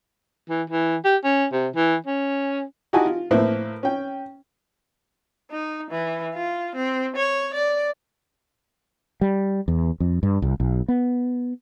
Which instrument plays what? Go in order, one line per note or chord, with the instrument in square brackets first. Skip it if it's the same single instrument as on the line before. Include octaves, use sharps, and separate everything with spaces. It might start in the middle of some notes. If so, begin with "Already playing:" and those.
[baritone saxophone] E3
E3
G4
C#4
C3
E3
C#4
[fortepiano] D#4 E4 F#4 G4 G#5 A5
F4
A2 A#3 B4 C5 E5
C#4 G5
[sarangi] D#4
E3
F4
C4
C#5
D5
[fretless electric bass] G3
E2
F2
G2
C2
B1
B3